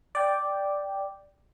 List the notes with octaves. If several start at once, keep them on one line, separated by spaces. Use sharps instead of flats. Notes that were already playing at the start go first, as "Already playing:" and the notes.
D5 G5